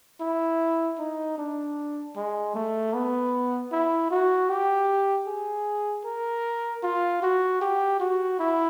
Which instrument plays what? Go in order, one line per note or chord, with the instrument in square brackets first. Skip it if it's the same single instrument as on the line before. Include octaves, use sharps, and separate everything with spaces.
[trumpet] E4
D#4
D4
G#3
A3
B3
E4
F#4
G4
G#4
A#4
F4
F#4
G4
F#4
E4